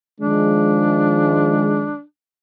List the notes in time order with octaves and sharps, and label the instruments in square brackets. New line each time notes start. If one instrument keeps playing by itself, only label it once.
[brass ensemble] D#3 F3 G#3 [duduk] D4